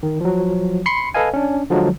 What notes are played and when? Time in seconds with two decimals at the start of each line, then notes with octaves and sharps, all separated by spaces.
0.03 D#3
0.21 F3 F#3
0.86 B5 C6 C7 C#7
1.14 A4 B4 D#5 F5 G#5
1.34 C#4 D4
1.70 D3 F3 F#3 G#3